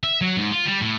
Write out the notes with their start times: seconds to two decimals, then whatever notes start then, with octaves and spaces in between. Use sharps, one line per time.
0.03 E5
0.21 F#3
0.37 G#2
0.51 F4
0.66 G3
0.80 A2